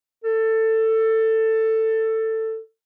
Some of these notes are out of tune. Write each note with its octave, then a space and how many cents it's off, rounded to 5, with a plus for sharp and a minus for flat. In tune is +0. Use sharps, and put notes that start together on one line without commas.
A4 +15